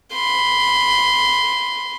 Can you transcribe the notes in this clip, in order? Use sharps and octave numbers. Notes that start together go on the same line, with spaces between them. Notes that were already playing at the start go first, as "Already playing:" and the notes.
B5 C6